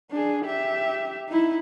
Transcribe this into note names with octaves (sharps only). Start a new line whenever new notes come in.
D4 G#4
G4 E5
D#4 E4